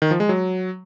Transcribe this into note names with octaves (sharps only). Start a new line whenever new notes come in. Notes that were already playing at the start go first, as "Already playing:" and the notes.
D#3
F3
G#3
F#3